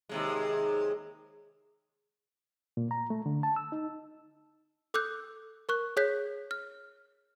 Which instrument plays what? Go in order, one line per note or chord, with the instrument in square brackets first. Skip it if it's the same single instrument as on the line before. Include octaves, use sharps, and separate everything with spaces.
[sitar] D#2 C3 G#3
[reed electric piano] A#2
A#5
A3
D3
A5
E6
D#4
[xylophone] A4 D6 E6 F#6 G6
A#4 C#6 F#6
G#4 C#5 F#6 G6 B6
F6